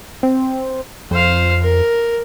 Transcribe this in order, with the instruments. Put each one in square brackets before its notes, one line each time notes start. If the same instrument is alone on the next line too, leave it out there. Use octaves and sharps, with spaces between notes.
[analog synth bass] C4
[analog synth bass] F2 [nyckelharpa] C5 F5
[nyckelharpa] A#4